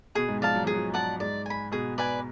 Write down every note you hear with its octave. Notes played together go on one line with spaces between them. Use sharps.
B2 B3 G#4
G#2 G#3
F3 D5 F5 A5
F#3
F3 G#4
F#3
D5 F#5 A5
G#2 G#3 D5
G#5 B5
B2 B3 G#4
B4 D5 G#5